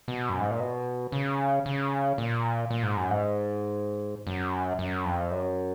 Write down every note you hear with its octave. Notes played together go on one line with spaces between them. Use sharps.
B2
F#2
G#2
A#2
B2
C#3
C#3
A#2
A#2
G#2
F#2
G#2
F#2
F#2
F2
F#2